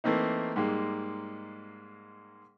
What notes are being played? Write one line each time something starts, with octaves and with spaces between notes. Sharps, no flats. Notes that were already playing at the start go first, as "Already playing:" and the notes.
E3 A3 A#3 C4 D#4
G#2 G3 G#3 A#3